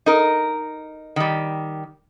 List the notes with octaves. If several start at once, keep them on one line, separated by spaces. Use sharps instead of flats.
D#4 A#4
D#3 G3